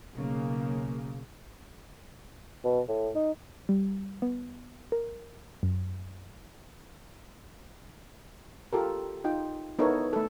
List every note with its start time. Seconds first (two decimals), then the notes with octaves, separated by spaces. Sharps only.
0.13 B1 C#3 A#3
2.65 B2
2.88 A2
3.15 D#4
3.69 G3
4.22 B3
4.92 A#4
5.63 F#2
8.73 F4 G4 A4 A#4
9.24 D#4 F4 G5
9.79 B3 D#4 E4 A4 A#4 C#5
10.13 A3 A4